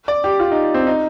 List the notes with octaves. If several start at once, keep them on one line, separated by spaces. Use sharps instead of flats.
D5
G4
F4
D#4
C4
D#4